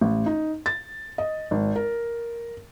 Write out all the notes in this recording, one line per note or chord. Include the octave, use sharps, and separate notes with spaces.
A1
D#4
A6
D#5
G#1
A#4